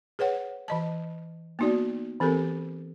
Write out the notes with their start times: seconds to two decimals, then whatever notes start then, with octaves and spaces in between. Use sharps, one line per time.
0.19 G#4 B4 C#5 F#5
0.68 E3 D#5 A5
1.59 A#3 B3 D#4 F#4 D5
2.20 E3 C4 G4 A4 A#4